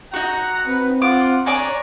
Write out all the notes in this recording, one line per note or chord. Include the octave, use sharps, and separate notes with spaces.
D#4 F#4 F#5 A#5
C4 B4
F4 F#5 D6
D4 C#5 G#5 A#5 D6